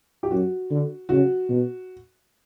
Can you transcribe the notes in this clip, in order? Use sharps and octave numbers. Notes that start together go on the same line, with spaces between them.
G4
F#2 F#4
D3
C#3 F#4
B2